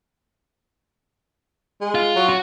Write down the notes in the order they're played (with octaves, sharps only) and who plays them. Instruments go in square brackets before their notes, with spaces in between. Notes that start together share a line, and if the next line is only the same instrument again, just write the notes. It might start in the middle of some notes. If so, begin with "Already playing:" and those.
[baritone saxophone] G#3
[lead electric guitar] F4
[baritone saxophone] F#3
[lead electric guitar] F#4